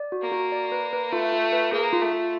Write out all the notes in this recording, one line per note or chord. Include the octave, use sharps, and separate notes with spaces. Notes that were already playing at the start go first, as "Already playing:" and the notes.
Already playing: D5
F#4
A#3
F#4
D5
B4
B4
A3 F4
F4
B4
A#3 G#4
F4
A3
F4